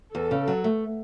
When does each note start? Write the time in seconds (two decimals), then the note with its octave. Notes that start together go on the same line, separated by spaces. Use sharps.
0.14 E2 A4
0.31 C#3
0.48 F#3
0.64 A3